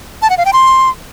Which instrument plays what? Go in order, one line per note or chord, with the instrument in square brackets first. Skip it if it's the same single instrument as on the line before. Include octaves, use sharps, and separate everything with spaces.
[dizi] A5
F#5
F5
G5
C6